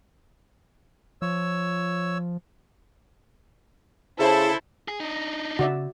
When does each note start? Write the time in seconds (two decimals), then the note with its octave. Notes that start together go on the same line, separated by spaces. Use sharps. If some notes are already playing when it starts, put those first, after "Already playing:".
1.22 F3 C#5 E6
4.19 C#3 E4 A4 C5 A5
4.88 G#4
5.00 D4 D#4
5.59 C#3 C4 C#4 F#4 D5 E5